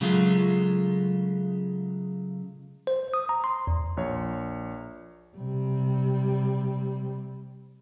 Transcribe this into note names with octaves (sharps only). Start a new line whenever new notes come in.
C#3 F#3 G#3 A3 F4
C5
D#6
A#5
C6
E2
A#1 C#5
C3 G3